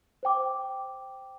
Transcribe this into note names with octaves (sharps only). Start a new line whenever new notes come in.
C5 G5 D6